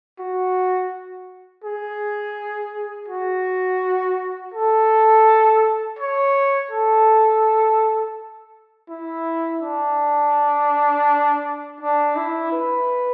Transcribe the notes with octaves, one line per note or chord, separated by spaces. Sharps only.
F#4
G#4
F#4
A4
C#5
A4
E4
D4
D4
E4
B4